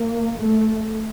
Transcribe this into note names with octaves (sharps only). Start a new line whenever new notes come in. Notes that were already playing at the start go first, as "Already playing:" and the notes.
Already playing: A#3
A3